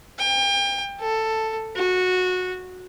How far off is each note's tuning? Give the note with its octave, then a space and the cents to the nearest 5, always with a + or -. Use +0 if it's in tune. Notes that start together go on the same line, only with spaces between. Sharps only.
G5 +35
A4 +10
F#4 -15